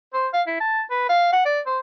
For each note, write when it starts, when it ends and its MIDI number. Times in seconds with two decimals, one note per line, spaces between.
0.14 0.28 72
0.34 0.42 77
0.47 0.55 64
0.61 0.82 81
0.91 1.08 71
1.09 1.31 77
1.33 1.45 78
1.46 1.60 74
1.66 1.79 72